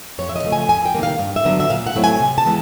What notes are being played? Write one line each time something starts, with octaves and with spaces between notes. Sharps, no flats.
F2 C#5
E5
D#5
C#3 F3 A3
G#5
F2 G#5
G5
C3 D#3 G3 A#3
F5
G2
E5
D3 F#3 B3 D4
E5
A#2 F5
F#5
F#3 A3 C4 E4
G#5
C3
A5
E3 G#3 B3